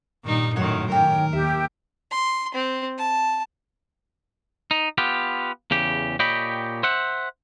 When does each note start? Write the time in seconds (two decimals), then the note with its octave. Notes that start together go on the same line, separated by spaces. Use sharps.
0.25 G2 A#2 D#3 G3 D#4
0.56 F#2 A2 D#3 F#3 C#5 D#5 F#5
0.92 D#3 C#4 D4 G4 A#4 G5
1.33 D#2 G4 E5
2.11 C6
2.54 C4
2.98 A5
4.71 D#4
4.98 B3 F4 G4
5.71 E2 C#3 G4
6.19 A#2 G4 C#5 D#5 G5 B5
6.83 C5 E5 F#5